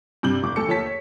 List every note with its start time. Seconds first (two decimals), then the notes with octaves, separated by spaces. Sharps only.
0.23 G2 C3 G6 F#7
0.43 F1 D6
0.56 D2 A4 C#7
0.68 D#2 F3 A4 C#5 A5 B6
0.86 C#5